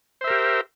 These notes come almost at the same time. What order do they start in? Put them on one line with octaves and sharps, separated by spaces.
C5 E5 A#4 G4